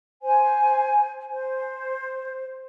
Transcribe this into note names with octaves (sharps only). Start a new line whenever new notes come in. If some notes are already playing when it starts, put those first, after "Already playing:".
C5 G#5
C5